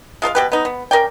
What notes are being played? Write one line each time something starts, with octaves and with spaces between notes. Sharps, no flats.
G#3 F4 A#4 F5
B2 G4 B4
B3 D#4
B3
C#4 A#4 D5 G5